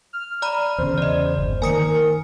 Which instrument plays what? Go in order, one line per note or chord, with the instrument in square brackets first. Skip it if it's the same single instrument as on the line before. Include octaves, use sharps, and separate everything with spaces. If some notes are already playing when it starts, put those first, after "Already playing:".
[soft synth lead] F6
[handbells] D5 A#5 B5
[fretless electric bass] E2 C#3 [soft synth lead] C5
[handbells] D5 D#5
[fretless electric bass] G1
[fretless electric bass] D#3 A#3 [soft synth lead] A#4 [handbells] G#5 D#6 C#7